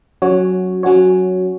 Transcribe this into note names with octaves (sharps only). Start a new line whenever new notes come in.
F#3 C#4 F#4 C#5
F#3 C#4 F#4 C#5